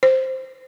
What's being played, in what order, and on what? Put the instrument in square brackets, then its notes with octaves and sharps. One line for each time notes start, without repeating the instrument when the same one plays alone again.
[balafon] C5